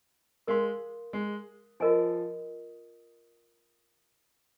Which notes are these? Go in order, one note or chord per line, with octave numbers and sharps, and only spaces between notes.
G#3 A#4 F5 C6
G#3
F3 F4 A#4 D#5 G#5